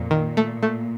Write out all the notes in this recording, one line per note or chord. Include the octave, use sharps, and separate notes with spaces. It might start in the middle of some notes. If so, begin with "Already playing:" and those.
Already playing: F2 A#2
D#3
A3
A3